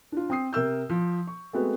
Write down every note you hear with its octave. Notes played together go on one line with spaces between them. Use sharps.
D4 F4
C4 G5 D#6 C7
C3 A#4 E6 G6
F3
C#6
G#3 A3 B3 C4 F#4